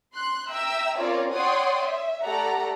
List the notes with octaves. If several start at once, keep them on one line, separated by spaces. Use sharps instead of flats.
C6 F#6
E5 G5 A#5 E6
C4 C#4 F4 A#4 C#5 D5
C#5 D5 F#5 G5 C6 D#6
E5
A3 G4 A4 D5 F#5 A#5